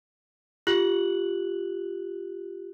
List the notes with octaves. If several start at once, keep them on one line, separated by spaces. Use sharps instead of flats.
F4 G4 F#6 F#7